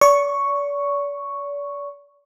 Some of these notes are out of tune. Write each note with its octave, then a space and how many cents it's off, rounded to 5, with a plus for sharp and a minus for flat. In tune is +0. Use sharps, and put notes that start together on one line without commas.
D5 -40 C#6 +0